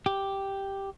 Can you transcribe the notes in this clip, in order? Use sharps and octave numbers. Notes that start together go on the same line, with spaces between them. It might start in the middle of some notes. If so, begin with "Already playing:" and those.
G4